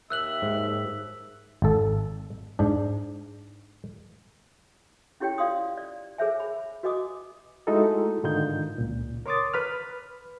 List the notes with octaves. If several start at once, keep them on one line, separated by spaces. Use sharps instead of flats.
D#2 E5 E6 F#6 F#7
G#2
G#1 A4
G#2 D4
C#4 E4 G4 C#5 G5
F4 D5 F5 C6 D#6
D5
G#4 A#4 C5 C#5 E5 G#5
B5
F#4 B4 D#5 G#5 D6 D#6
G#3 A3 D#4 E4 F#4 A4
G#2 D3 D#3 D#4 F4 G6
C#2 A#2
A#4 C#5 C6 D6 D#6 A6
B4 B5 F6